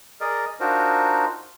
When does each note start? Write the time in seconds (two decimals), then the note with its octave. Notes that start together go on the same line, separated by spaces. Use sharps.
0.21 G#4 A#4 D5 D#5
0.60 D4 D#4 F4 F#4 A#4 C5